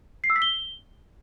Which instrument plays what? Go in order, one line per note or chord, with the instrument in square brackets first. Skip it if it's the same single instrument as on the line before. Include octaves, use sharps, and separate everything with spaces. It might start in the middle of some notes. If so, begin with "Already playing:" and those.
[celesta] C7
E6
B6
G7